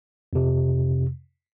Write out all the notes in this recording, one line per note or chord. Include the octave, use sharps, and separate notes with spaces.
F2 C3